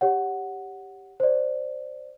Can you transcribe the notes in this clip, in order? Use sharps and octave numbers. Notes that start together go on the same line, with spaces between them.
G4 C#5 F#5
C5 D5